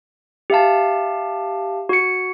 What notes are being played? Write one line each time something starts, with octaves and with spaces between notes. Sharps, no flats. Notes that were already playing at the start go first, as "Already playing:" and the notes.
G4 E5 F5 A5
F#4 C#7